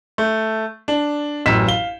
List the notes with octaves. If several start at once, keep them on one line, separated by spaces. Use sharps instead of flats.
A3
D4
A1 F#2 E6 B6 E7
F5 G7